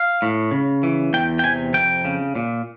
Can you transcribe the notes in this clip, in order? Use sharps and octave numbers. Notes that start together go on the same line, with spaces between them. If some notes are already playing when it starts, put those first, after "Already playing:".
Already playing: F5
A2
C#3
E3
E2 G5
G5
C3 G#5
F2 G5
C#3
A#2